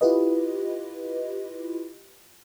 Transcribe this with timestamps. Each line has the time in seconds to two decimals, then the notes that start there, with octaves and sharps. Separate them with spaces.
0.01 E4 F4 G4 B4 D#5